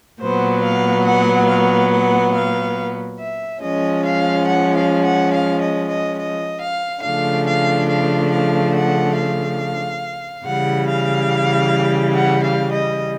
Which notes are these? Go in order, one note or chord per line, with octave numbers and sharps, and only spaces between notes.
A#2 F#3 B3 C5
F5
F#5
F5
F#5
F5
E5
F3 G#3 C#4 D#5
F5
F#5
F5
F#5
F5
D#5
D#5
D#5
F5
C#3 F3 A3 D4 F5
F5
F5
F5
F#5
F5
C#3 E3 G3 F#5
F5
F#5
F5
D#5